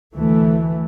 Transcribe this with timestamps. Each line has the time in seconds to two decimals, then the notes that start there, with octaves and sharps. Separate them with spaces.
0.15 D2 E3 A3